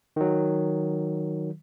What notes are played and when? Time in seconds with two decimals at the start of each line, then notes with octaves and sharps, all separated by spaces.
0.16 D#3 F#3